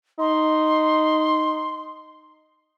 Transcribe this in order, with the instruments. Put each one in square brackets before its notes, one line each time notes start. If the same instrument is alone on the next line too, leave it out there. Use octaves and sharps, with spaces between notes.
[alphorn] D#4 [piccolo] C6